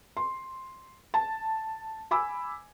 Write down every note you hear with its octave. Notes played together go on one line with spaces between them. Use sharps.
C6
A5
G#5 B5 D6 E6